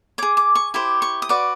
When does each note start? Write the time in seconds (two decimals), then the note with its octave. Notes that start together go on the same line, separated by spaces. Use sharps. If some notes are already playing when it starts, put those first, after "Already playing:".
0.18 C#5 D6
0.23 G#4
0.37 D6
0.55 C#6
0.74 E4 G4 C5
1.02 C#6
1.22 D#6
1.29 F#4 B4 D5 D6